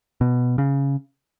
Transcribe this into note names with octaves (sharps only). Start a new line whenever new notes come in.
B2
C#3